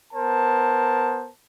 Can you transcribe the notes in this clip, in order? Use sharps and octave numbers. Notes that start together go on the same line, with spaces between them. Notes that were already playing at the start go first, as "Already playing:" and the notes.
B3 A#4 C5 A5